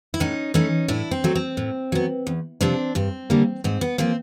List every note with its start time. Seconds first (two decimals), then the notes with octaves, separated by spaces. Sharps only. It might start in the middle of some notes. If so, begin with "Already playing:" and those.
0.14 E4
0.20 A2 C#4 D#4
0.54 E3 A3 C#4 D#4
0.88 A2 D4 E4
1.11 C4
1.24 F#3 A3
1.35 C4
1.57 A2
1.92 F#3 B3
2.27 E2
2.61 C3 F3 C4 D4
2.95 G2 C4
3.30 D3 G3 A#3
3.64 G#2 C4
3.81 B3
3.98 F3 A#3 C4